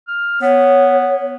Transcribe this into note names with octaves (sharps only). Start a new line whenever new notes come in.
F6
B3 C#5